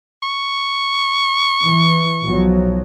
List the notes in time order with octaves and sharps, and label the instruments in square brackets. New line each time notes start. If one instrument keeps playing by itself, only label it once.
[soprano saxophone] C#6
[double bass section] E3
B1 F3 F#3